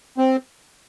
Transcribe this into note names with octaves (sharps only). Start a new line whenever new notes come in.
C4